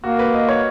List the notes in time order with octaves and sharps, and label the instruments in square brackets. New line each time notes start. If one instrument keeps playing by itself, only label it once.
[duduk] A#3 [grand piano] F#4
[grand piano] B4
D#5
C#5